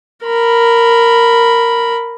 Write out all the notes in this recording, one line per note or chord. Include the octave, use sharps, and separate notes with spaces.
A#4 B5